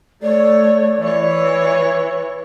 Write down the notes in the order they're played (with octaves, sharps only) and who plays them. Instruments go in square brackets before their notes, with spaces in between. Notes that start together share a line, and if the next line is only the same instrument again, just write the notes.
[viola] A3 C#5 [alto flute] D5
[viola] E3 C#5